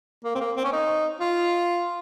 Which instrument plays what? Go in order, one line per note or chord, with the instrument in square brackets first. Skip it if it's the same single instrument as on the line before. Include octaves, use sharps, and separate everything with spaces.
[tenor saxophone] A#3
C4
A#3
C4
C#4
D#4
F4